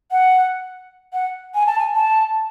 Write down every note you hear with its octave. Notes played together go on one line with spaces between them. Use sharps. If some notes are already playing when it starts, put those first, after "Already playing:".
F#5
F#5
G#5
A5
G#5
A5